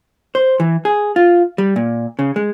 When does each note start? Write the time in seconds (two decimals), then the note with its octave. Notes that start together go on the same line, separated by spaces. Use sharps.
0.35 C5
0.60 E3
0.85 G#4
1.16 F4
1.58 G3
1.76 A#2
2.19 C#3
2.36 G#3